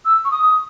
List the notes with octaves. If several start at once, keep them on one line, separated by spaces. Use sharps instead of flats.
E6
C#6
D#6